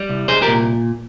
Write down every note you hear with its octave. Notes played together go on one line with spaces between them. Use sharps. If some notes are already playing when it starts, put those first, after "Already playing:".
Already playing: G3
C2
C2 G#4 C5
G4 A#4
A#2